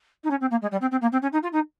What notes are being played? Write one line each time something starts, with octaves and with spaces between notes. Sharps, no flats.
D#4
C#4
C4
A#3
G#3
G3
C4
C4
A#3
C4
C#4
D#4
F4
D#4